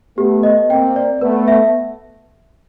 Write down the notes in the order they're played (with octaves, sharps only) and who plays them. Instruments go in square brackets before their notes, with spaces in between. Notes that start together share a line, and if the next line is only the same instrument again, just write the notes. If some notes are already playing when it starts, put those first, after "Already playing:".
[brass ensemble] A3 B3 [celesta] G4
[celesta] D#5
[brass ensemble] A#3 C4 [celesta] G5
[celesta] D5
[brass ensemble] A3 B3 [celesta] B4
[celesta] E5